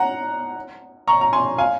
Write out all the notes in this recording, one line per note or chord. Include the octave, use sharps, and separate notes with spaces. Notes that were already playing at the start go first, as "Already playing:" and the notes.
Already playing: F#5 A#5
A#5 C#6
A#5
G#5 C6
F5 G#5